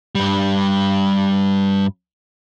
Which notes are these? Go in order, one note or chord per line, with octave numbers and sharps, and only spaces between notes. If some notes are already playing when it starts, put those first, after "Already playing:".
G2 G3